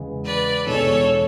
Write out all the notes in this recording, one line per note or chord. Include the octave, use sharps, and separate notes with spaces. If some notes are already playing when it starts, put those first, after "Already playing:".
Already playing: E2 C#3 G#3 B3
B4 D5
E2 B2 G#3 D4 A4 C#5